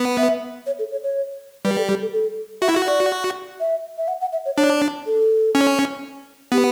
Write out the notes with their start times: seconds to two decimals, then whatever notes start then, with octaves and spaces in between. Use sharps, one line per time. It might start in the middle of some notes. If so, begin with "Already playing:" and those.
Already playing: B3
0.18 E5
0.66 C#5
0.79 A4
0.91 C#5
1.03 C#5
1.65 G3 B4
1.77 A4
1.89 G4
2.02 A4
2.13 A4
2.62 F#4 E5
2.69 E4
2.76 F#4
2.87 D5
3.60 E5
3.98 E5
4.08 F#5
4.21 F#5
4.33 E5
4.46 C#5
4.57 D4 C#5
5.06 A4
5.55 C#4
6.52 B3 G4